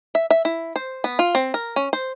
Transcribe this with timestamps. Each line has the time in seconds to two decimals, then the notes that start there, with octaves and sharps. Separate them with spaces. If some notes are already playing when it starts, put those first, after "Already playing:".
0.15 E5
0.31 E5
0.45 E4
0.76 C5
1.04 B3
1.19 F4
1.35 C4
1.54 A#4
1.76 C#4
1.93 C5